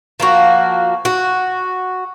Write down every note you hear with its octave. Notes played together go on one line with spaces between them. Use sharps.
F3 A#3 F#4
F#4